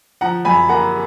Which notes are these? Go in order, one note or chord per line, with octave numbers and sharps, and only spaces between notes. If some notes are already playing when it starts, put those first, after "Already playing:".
F3 F#5 A#5
F#2 G#5 B5
A#3 F#5 A#5